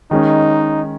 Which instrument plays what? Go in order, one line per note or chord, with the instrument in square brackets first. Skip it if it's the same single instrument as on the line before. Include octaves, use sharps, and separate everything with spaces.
[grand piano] D#3 G#3 C#4 [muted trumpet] D#4